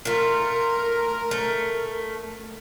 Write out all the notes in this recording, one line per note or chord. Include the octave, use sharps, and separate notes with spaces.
A3 F4 A#4
A3